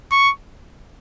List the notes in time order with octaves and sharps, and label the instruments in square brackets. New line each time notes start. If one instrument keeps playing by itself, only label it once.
[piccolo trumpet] C#6